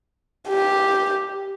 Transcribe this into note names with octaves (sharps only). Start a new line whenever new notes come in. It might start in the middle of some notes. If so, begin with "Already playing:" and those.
G4